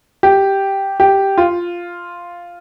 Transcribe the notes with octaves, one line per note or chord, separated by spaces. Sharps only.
G4
G4
F4